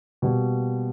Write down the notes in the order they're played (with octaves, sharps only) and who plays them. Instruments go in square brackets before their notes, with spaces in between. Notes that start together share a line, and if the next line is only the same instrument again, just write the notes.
[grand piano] B2 G3 A#3